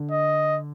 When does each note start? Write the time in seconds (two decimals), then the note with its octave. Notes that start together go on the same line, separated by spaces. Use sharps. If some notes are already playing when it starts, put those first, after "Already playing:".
Already playing: D3
0.11 D#5